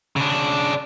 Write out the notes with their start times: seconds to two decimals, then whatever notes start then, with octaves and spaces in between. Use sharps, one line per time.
0.16 C#3 D4